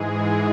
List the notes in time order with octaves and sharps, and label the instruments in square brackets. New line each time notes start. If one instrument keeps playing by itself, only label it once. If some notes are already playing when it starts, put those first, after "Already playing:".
Already playing: [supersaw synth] G#2 E3 G#3 G#4